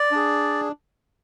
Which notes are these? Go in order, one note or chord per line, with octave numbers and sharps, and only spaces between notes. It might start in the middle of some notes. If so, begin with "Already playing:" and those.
Already playing: D5
D4 G#4